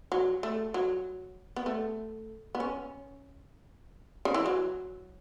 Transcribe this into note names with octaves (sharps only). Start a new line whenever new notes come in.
F#3
A3
F#3
B3
A3
B3
C#4
C#3
E3
F#3